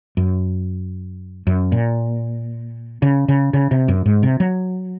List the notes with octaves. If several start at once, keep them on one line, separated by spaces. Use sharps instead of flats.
F#2
F#2
A#2
C#3
C#3
C#3
C3
F#2
G#2
C3
F#3